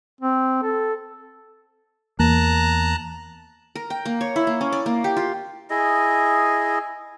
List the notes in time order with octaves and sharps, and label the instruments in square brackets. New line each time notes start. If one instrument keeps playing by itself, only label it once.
[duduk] C4
A4
[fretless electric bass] E2 A#3 [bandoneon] A5 A#5 F#6
[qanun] A#4
G5
A#3
C#5
E4
A#3
C#4
D5
A#3
G4
F4
[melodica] E4 G#4 D#5